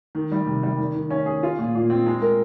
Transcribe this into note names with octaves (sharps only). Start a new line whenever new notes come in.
D#3
G3
C3
G3
D#3
D#3
C#4
G#4
F4
A#2
A#2
C4
G#3
A#4